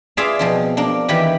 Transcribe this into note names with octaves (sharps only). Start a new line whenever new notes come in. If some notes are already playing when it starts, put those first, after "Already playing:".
F4 G#4 B4 D5 E5 F5
B2 F3 C4
A#3 D4
D#3 E3 G4 B4 B5